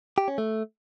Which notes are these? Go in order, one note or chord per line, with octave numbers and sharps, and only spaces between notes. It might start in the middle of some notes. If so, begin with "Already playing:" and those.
G4
C#4
A3